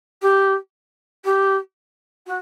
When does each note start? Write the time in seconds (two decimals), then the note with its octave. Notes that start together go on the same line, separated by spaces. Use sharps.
0.22 G4
1.24 G4
2.26 F#4